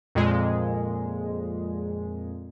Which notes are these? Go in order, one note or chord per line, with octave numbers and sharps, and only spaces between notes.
F2 A#2 G#3